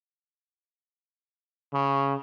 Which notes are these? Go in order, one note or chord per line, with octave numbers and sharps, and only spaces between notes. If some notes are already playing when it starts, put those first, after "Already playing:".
C#3